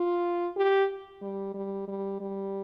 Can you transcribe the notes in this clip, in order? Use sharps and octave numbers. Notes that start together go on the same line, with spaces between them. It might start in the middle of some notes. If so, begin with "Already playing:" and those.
Already playing: F4
G4
G3
G3
G3
G3